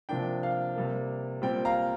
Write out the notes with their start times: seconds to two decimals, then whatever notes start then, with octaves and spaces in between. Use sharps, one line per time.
0.09 C3 F3 A#3 D4 G5
0.43 F5
0.76 C3 G3 A#3
1.42 A#2 G3 C4 G5
1.65 F5 A#5